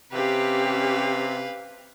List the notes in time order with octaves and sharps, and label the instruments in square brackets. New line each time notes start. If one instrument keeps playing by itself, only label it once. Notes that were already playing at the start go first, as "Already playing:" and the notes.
[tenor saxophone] C3 [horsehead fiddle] C#4 G4 [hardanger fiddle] B4 F5